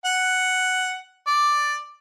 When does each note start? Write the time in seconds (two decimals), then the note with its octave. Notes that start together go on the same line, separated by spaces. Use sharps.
0.05 F#5
1.27 D5